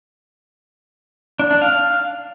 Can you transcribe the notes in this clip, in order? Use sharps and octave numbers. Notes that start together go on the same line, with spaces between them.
D4
D4
F5